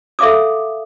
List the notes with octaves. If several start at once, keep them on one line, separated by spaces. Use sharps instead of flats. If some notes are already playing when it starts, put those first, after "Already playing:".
A4 E5 F5 D6 D#6